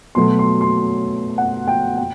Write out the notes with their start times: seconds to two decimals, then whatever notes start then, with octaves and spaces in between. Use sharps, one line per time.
0.15 B2 F#3 A3 C6
0.39 C6
0.61 C6
1.38 F#5
1.67 G5
1.98 G5